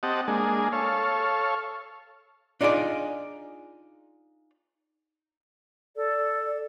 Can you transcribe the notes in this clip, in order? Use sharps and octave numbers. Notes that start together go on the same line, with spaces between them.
C4 G4 D#5 F#5 A5
G#3 A#3 D4 G#4
A4 C#5 F5
D4 D#4 F4 G#4 D5
A4 D5